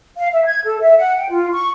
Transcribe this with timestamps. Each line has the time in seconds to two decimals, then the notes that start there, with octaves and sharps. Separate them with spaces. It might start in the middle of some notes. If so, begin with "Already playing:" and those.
0.17 F5
0.33 E5
0.46 G#6
0.65 A4
0.81 E5
0.97 F#5
1.17 G5
1.30 F4
1.53 C#6